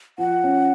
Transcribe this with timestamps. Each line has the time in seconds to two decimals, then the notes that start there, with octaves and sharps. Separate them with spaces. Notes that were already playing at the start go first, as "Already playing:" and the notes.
0.18 F3 F#5
0.44 C#4